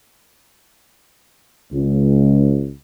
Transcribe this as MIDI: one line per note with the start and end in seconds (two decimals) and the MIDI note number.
1.72 2.71 37